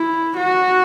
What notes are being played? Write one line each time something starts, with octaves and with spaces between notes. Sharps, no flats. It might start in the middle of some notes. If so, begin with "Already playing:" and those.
Already playing: E4
F#4